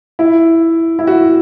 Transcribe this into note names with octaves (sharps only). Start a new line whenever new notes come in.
E4
E4
F#4